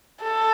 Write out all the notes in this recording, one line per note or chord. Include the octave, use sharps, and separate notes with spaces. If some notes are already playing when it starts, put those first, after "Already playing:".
A4